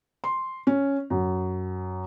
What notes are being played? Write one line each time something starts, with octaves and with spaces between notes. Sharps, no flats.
C6
C#4
F#2